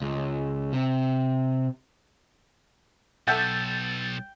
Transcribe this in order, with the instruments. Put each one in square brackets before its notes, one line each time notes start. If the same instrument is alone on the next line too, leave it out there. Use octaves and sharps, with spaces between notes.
[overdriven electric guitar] C#2
C3
[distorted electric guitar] B1 [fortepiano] A4 E5 F#5 [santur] G5 [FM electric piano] A6